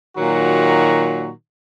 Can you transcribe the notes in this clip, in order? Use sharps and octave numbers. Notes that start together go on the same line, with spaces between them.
A#2 D#3 F#3 F#4 A#5